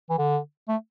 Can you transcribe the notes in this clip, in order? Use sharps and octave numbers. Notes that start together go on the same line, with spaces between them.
E3
D3
A3